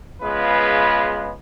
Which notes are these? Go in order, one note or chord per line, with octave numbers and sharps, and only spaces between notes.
C#3 G#3 B3 F4 B4